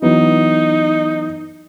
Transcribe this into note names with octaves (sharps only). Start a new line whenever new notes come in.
E3 F#3 B3 D#4